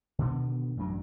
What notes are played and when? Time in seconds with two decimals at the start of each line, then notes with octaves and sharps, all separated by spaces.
0.19 B2 D3 D#3 B3
0.77 A1 F#2 F#3 D4